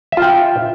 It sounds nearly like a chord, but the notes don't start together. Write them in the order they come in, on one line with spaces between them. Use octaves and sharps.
E5 F4 G5